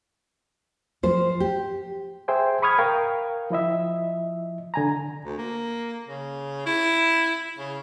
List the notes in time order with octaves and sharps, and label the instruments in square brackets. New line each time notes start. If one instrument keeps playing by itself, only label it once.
[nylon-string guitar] F3 C5
G4
[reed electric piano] G#4 C5 E5 G5 G#5
B5 C#6 D#6 F6 G#6
A#4 F5 G5
F3 E4 D#5 E5
D3 G#5 A#5
[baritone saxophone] D2
A#3
C#3
E4
C#3